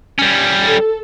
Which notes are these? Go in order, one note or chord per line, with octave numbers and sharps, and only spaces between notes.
G3 C#4
A4